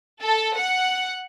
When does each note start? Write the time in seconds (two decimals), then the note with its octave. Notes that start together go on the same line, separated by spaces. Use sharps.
0.24 A4
0.57 F#5